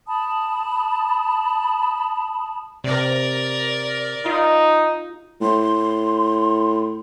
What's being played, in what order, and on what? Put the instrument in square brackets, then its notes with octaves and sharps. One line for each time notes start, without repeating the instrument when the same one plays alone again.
[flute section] A5 B5 D#6
[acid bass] C3 [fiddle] A#4 D5
[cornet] D#4 [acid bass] F4
[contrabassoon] A2 [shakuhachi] C6